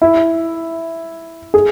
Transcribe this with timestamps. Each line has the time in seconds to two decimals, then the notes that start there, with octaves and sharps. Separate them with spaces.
0.02 E4
1.54 G#4